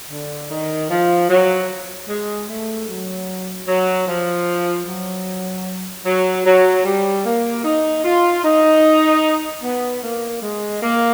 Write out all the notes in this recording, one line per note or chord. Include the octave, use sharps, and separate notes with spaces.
D3
D#3
F3
F#3
G#3
A3
F#3
F#3
F3
F#3
F#3
F#3
G3
A#3
D#4
F4
D#4
B3
A#3
G#3
A#3